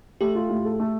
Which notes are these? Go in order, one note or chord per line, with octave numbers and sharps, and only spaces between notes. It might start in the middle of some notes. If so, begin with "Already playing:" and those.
A3 G4
F4
A2
A4
A3